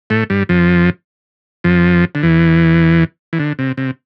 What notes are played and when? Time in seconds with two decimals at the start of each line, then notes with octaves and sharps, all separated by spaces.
0.10 A2 A3
0.30 G2 G3
0.49 F2 F3
1.64 F2 F3
2.15 D3
2.23 E2 E3
3.33 E3
3.39 D3
3.59 C3
3.77 C3